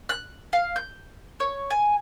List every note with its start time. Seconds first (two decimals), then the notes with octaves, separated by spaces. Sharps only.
0.09 F#6
0.53 F5
0.76 G6
1.40 C#5
1.70 G#5